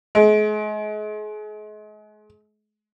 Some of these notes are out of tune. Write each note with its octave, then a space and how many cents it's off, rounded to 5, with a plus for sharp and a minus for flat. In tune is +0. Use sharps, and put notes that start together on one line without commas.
G#3 +40